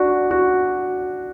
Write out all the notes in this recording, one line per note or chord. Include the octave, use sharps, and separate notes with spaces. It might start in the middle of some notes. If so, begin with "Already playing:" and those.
Already playing: D4 F#4
F#4